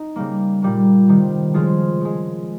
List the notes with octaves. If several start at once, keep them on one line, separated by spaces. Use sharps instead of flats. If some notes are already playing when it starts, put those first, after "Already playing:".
Already playing: D#4
C#3 G3 A#3
A#2 G3 A#3
C3 D#3 G3
C#3 F3 G#3 F4 G#4
C#3 G#3